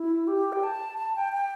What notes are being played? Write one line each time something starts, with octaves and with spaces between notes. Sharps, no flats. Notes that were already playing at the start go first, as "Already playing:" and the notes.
Already playing: E4
G4
G5
A5
A5
G5
G5